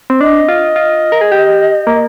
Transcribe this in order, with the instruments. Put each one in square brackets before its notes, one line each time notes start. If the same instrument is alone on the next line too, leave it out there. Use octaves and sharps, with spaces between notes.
[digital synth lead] C4
[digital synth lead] D4 [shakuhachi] D#5
[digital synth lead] F4
F4
A#4
G#4
G4
A#3